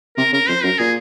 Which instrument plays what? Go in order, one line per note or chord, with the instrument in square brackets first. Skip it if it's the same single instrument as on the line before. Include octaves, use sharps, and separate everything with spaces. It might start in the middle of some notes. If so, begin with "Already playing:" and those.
[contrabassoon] C3 [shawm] A#4
[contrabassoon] C#3 [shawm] A#4
[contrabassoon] F2 [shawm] C5
[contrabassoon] F#2 [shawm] A#4
[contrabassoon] A#2 [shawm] G#4